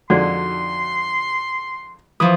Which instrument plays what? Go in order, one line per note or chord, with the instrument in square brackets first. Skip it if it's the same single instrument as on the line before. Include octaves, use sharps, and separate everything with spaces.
[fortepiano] F2 D3 G#3 [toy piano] D#4 F#4 D5 [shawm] C6
[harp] E3 F3 [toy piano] D#6